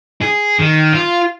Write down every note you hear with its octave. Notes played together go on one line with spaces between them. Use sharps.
G#4
D#3
F4